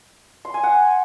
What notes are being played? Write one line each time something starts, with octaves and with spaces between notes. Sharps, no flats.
C6
G#5
F#5